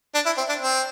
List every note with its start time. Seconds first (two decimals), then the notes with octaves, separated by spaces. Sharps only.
0.15 D4
0.26 E4
0.38 C4
0.49 D4
0.61 C4